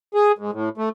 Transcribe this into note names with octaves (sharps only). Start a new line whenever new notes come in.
G#4
G#2
A2
A3